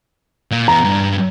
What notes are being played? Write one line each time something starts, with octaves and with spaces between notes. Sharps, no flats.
A#2
E3 B3 A#5
G2